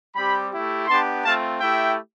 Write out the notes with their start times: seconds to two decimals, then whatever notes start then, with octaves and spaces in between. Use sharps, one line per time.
0.16 G3 C4 G4 G5 B5
0.52 A3 E4 G4
0.87 B3 D4 G4 A5 C6
1.24 A3 C4 F4 F5 A5
1.60 A3 E4 G4 E5 G5